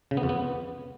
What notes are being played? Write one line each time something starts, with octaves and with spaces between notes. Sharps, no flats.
C#3
B3
F2
B3